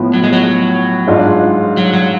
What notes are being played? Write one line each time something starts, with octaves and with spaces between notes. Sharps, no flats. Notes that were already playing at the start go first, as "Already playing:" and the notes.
Already playing: A2 F3 B3
F#3
G#3
F#3
G#2 G#3 D4 F4
F#3
F#3